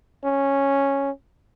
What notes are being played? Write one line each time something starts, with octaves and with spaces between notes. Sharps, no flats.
C#4